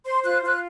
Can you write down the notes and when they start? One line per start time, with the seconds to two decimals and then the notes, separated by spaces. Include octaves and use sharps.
0.05 C5 C6
0.24 F4 F#6
0.43 F4 F#6